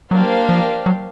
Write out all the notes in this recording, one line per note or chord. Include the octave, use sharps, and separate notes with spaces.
F#3 A#3 D4 G4 C5 F5
F3
F#3